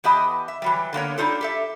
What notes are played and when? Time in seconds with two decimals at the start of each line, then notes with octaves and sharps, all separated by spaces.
0.04 E3 B3 G4 D#5 A5
0.48 E5
0.62 E3 F#3 G3
0.93 D3 A#3 B3 C#5
1.18 G3 D4 D#4 F4 A4
1.41 G4 A4 E5